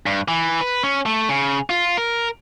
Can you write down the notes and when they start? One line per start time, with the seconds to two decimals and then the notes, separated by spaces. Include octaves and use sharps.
0.06 G2
0.28 E3
0.61 B4
0.83 C#4
1.06 A3
1.29 C#3
1.70 F4
1.97 A#4